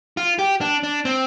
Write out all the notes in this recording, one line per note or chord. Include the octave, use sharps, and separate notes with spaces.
F4
G4
D4
D4
C4